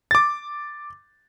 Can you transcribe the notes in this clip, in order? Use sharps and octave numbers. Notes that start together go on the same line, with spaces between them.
D6 A6